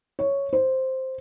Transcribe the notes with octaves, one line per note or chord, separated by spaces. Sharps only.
C#5
C5